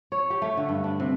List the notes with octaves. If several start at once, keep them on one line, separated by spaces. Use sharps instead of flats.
C#5
G4
A3
D3
G2
D4
C3